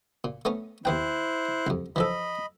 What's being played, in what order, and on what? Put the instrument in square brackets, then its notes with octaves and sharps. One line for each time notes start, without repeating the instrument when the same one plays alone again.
[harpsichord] A#2
A3 B3 C#4
[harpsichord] D#2 B3 G5 [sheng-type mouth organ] E4 C5 F#6
[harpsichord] C2 F2
[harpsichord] E3 F3 A4 [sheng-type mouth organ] D#5 B5